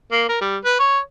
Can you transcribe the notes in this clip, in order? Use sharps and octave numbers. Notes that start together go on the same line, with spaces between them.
A#3
A#4
G3
B4
C#5